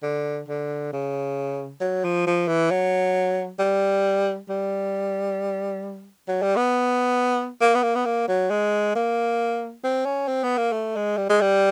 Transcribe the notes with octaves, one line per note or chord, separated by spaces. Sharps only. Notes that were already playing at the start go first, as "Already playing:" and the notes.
D3
D3
C#3
F#3
F3
F3
E3
F#3
G3
G3
F#3
G3
B3
A#3
B3
A#3
B3
A#3
F#3
G#3
A#3
C4
C#4
C4
B3
A#3
A3
G#3
G3
G#3
G3